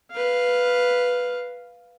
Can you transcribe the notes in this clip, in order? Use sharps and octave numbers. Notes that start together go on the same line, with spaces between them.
B4 F5